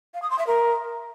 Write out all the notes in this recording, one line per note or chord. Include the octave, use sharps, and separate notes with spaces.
F5
D#6
C6
E5
A#4